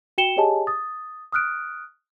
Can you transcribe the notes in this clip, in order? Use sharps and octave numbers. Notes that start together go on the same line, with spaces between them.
F#4 G5 C#7 E7 G7
G4 G#4 C#5 D#5 G#5 A5
D#6 A6
D#6 F6 F#6 D7